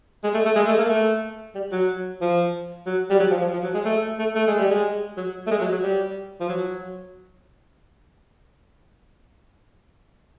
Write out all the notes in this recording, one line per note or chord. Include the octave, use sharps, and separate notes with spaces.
G#3
A3
A3
G#3
A3
A#3
A3
G3
F#3
F3
F#3
G3
F#3
F3
F3
F3
F#3
G#3
A3
A3
A3
G#3
G3
G#3
F#3
A3
G#3
F#3
F#3
G3
F3
F#3